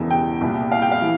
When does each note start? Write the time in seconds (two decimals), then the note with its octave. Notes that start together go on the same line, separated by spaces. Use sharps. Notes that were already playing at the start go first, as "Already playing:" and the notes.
Already playing: E1 E2 C#3 E3
0.11 G5
0.41 C2 A#2
0.72 F5
0.82 G5
0.92 F5
1.02 E3